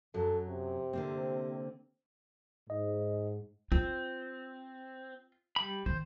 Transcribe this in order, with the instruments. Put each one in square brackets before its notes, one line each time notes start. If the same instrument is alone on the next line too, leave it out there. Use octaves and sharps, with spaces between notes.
[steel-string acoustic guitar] F#2 F#3 [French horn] A4
[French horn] C3
[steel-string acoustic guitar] D3 A#3 C4
[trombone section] G#2 [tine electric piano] D#5
[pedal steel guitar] C4 [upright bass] F4
[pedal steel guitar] G3 B5
[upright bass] D#3 [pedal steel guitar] C5